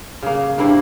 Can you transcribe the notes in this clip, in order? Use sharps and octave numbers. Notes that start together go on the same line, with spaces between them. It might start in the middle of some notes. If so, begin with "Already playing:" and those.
C#3 A#3
G2 C3 A#3 E4